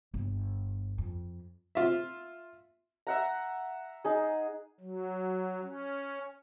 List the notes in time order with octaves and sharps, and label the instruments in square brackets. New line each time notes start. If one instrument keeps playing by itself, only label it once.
[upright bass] G1
F2
[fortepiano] F4 E5
[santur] E5 F#5 A#5
D#4 G#4
[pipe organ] F#3
C#4